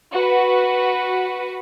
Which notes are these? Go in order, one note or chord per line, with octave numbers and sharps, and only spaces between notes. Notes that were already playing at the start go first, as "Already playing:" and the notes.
F#4 B4